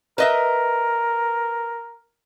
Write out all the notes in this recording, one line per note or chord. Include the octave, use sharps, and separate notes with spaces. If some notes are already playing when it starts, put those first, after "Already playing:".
A#4 B4 D#5 E5